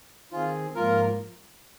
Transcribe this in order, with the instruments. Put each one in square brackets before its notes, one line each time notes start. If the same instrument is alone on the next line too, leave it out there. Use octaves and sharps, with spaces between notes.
[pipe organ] D#3 C4 G#4 [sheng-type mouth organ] F4
[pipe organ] G#2 F3 A#3 [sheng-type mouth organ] F4 A#4